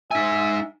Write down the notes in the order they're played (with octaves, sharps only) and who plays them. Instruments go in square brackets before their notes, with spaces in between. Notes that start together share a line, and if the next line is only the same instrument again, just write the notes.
[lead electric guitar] D#4 G#5 [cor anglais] E5